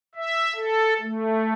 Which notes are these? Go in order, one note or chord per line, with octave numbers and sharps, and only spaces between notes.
E5
A4
A3